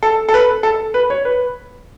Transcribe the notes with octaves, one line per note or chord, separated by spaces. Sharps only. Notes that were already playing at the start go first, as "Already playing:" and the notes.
A4
A4
B4
A4
B4
C#5
B4